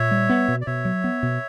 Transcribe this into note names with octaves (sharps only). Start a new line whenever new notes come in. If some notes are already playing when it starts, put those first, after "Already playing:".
Already playing: A#2 C#5 E5
G3
B3
B2
D5
B2 C#5 E5
F#3
B3
B2